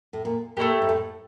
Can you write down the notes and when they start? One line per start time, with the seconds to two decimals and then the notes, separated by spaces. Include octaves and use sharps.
0.13 A2
0.25 A#2
0.57 A#2 A3 C#4 E4 G4
0.82 G#2
0.89 A2